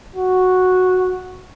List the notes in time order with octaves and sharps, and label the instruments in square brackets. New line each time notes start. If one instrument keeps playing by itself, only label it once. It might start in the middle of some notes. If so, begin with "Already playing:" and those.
[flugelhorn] F#4